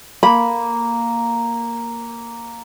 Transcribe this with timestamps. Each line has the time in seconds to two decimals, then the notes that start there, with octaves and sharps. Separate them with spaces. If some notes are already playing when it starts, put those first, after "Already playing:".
0.23 A#3 A#4 B5